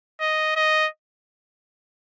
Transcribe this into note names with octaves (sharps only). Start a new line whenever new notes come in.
D#5
D#5